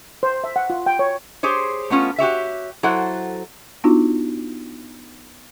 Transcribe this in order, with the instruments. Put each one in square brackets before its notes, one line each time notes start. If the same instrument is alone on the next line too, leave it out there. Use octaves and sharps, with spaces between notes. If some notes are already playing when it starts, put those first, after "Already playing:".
[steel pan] C5
E5
F#5
F4
G5
C#5
[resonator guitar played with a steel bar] G4 G#4 C5 C#5
A3 B3 C#4 F4
F#4 G4 C#5 E5
F#3 E4 A4 C5 F#5
[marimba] B3 D4 D#4 F4 F#4